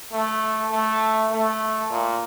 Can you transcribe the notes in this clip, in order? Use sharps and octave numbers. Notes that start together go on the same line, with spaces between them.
A3
A3
A3
A#2